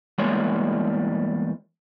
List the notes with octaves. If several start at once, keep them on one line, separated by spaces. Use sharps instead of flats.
E2 G3 G#3 A#3 C#5